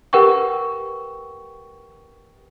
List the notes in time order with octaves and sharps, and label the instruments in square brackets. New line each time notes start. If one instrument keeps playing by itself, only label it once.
[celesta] G4 A#4 B4 F#5 G5 C#6